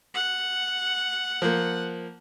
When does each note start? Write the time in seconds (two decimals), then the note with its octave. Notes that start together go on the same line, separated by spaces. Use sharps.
0.14 F#5
1.42 F3 A#3